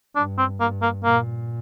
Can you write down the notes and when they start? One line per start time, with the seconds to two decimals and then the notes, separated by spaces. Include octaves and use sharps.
0.16 G2 D4
0.38 C4
0.59 G2 A#3
0.82 A#3
1.04 A#2 A#3